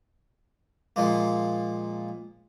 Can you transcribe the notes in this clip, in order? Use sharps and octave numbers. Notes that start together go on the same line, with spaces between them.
A#2 F3 G#3 A#3